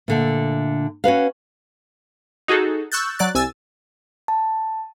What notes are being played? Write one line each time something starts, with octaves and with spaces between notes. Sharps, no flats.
A#2 D3 A3
C#4 F#4 B4 F5
D#4 F#4 G#4 A4
C#6 E6 F#6 G6 A6
F#3 D5 F#6 A6
C2 G#5 E6 A6
A5